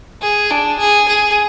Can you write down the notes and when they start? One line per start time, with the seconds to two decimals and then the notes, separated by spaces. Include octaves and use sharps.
0.22 G#4
0.50 D4
0.79 G#4
1.08 G#4